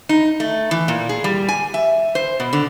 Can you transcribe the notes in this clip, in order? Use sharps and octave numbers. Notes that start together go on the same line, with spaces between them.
D#4
A3
E3
A#2
G#4
G3
G#5
E5
C5
B2
D3